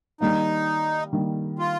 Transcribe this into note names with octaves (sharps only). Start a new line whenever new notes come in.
D#3 G3 A#3 D#4
D#3 G3 A#3
F4